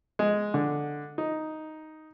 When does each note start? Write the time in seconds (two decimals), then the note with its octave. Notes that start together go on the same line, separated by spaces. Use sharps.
0.19 G#3
0.54 D3
1.18 D#4